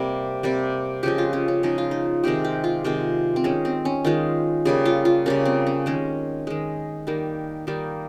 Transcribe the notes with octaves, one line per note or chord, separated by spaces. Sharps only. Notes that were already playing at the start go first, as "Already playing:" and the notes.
Already playing: C3 G3 A#3
C3 G3 A#3
C#3 F3 G#3 G4
F4
C#4
C#4
C#3 F3 G#3 D#4
F4
D#4
C3 D#3 G#3 G4
G4
F4
C3 D#3 G#3 F4
C4
D#3 G#3 C#4
C4
C#4
D#3 G#3 F4
C#3 G3 A#3 G#4
F4
F4
C#3 G3 A#3 C#4
C4
C#4
D#3 G#3 C#4
D#3 G#3
D#3 G3 A#3
D#3 G3 A#3